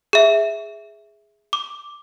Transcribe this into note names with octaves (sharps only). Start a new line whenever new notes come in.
G#4 E5
D6